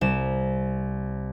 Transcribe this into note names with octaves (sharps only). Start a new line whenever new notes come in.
C2 E7